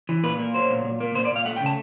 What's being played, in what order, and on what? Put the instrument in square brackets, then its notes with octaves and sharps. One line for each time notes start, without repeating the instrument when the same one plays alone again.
[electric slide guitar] E3
A#2 B4
A#3
F#3 C5
A#2
A#2
A#3
A#2 C5
D5
A#2 F5
A3 F#5
G5
C#3
A5